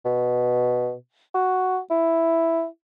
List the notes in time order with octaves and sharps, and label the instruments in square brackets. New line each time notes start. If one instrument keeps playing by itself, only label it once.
[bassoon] B2
F#4
E4